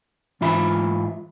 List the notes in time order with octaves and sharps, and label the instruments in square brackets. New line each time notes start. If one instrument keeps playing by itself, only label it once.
[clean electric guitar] G#2 E3 F4 E5 B5